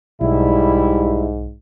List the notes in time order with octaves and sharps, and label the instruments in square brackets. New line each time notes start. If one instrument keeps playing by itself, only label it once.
[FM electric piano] B1 [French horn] G#2 [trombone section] G3 E4